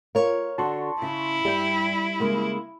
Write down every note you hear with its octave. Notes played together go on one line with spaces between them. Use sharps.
F4 A#4 C#5
D3 F#4 A5 C6 C#6
C#3 E4
G2 G3 E5 G5
C#3 G#3 A#3